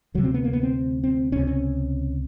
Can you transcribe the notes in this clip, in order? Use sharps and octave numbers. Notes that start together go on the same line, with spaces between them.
D2 C3 F#3
C4
B3
A#3
B3
C4
C4
C#2 C3 C#4
C#4